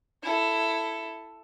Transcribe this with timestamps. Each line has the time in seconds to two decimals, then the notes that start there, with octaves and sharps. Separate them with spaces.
0.23 E4 A4